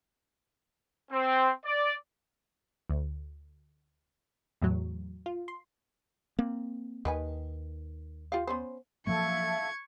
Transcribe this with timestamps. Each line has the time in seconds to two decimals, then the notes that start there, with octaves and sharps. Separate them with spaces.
1.12 C4
1.65 D5
2.90 D2
4.62 E2 A2 F#3
5.26 F4
5.48 C6
6.39 A#3 C4
7.05 D#2 D#3 B4 G#5
8.32 F4 G4 F5
8.47 B3 C#4 C5
9.07 F3 F#3 A#3 A4 E5 F5 C#6 G#6